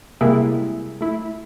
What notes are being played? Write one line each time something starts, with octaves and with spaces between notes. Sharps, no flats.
C3 G3 G#3 A#3 E4 G#4
A3 E4